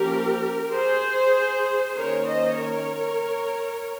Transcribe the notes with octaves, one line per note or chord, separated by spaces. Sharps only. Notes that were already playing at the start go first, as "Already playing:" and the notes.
Already playing: F3 A#3 C#4 G4 A#4
G#4 C5
D#3 A#3 C#4 A#4 C#5
C5 D#5
A#4 C#5